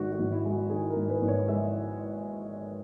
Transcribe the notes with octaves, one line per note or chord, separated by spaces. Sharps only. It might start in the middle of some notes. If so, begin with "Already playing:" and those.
Already playing: G#1 G#2 D#3 F#4
F#4
G#1
E4
G#3
F#4
D#3 G#4
A#4
G#2
B4
G#1
C#5
G#3 E5